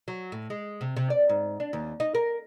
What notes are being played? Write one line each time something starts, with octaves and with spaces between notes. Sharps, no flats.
F#3
A2
G#3
C3
C3
D5
G#2
D4
D#2
D#4
A#4